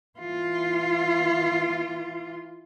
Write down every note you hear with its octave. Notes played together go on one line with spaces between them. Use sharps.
E3 F4